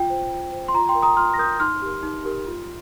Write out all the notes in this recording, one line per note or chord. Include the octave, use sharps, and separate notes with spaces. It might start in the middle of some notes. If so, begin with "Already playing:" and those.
Already playing: F4 G5
C5
F4
C5
C6
F4 A#5
G5 C6
A#4
A#5 D#6
F4 C6 F6
A#6
A#4 D#6 G6
D#4 C6 F6
G4 A#4
D#4
G4 A#4
F4